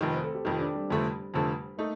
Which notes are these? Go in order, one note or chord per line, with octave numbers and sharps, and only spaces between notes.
F1 F2 D#3 A3
C4
A4
G4
F1 F2 D#3 G4
D4
G3
F1 F2 D3 A3
F1 F2 D3 A3
A3 A#3 D#4